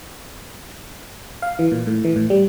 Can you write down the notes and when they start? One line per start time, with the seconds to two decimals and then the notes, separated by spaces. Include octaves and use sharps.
1.42 F5
1.59 E3
1.72 A#2
1.87 A2
2.04 E3
2.16 A2
2.30 G3